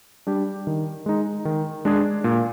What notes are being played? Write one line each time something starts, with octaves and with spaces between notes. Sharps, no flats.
G3 D4 G4
D#3
G#3 D#4
D#3
G#3 D4 G#4
A#2